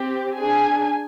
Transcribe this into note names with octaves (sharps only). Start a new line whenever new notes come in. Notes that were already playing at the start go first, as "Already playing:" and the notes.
Already playing: C4 G4
D4 G#4 G#5